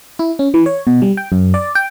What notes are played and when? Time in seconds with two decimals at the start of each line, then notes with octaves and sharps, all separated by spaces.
0.19 E4
0.39 C#4
0.54 E3
0.66 C#5
0.87 B2
1.02 G3
1.17 G5
1.32 F#2
1.54 D5
1.75 G5